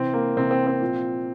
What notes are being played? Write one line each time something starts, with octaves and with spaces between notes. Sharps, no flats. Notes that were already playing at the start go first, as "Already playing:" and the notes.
Already playing: C3 E3 C4
A#3
C3 E3 C4
C4
C4
A#2 F3